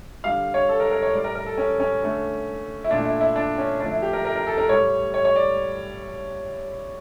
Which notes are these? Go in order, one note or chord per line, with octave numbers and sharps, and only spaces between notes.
D3 G3 F5
C#5
A4
A#4
A#4
C#5
A2 G3 D5
A#4
A#4
A4
C#4
C#4
D3 A3
E4
A#2 A3 D4
E4
E4
D4
C#4
D3 F3 A3 D4
E4
G4
A#4
A#4
A#4
A4
A#4
A2 G3 C#5
C#5
C#5
D5